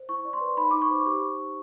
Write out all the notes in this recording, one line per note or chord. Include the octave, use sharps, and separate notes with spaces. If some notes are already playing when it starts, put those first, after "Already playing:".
Already playing: C5
E4 C#6
D5
C6
B4
D#4 B5
D#4 D6
C#6
C5
G4 C#6